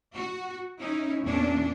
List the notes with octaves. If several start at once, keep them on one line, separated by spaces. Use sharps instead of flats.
F#4
C#4 D#4 E4
E2 A#2 C#4 D4